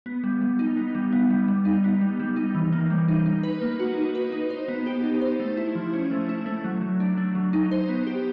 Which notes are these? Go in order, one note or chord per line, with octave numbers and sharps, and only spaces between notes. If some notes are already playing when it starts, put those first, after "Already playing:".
B3
G3
G3
D#4
B3
G3
B3
G3
G3
D#4
B3
G3
G3
D#4
E3
A#3
G3
D#4
D#4
B4
A#3
F#4
D#4
B4
D#4
C5
B3
G4
D#4
C5
A3
E4
F3
C#4
A3
E4
A3
F#3
F#3
D4
A3
F#3
D#4
C5
B3
G4